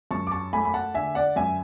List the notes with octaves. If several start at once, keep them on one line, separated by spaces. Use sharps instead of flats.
F#2 A5 C#6
D6
A5 C#6
A3 G#5 B5
B5
F#5 A5
D3 E5 G#5
D5 F#5
F#2 E5 G#5